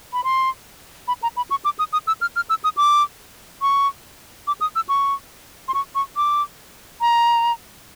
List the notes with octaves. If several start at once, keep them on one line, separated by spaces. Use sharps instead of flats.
B5
C6
B5
A#5
B5
C#6
D6
D#6
D#6
E6
F6
F6
E6
D#6
D6
C#6
D6
D#6
E6
C#6
C6
C#6
C#6
D6
A#5